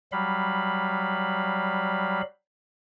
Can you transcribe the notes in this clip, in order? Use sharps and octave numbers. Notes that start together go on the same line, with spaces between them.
F#3 G3 F5 B5